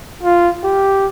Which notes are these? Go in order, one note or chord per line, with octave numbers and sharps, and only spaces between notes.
F4
G4